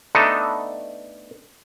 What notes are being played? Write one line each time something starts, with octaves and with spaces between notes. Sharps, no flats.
A3 B3 D4 D#4 A4